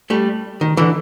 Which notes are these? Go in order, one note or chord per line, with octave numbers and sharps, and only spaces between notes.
G3 A3
D#3
D3 E3